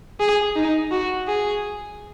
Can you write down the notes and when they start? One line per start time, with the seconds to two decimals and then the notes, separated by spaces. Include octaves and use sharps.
0.20 G#4
0.56 D#4
0.92 F#4
1.28 G#4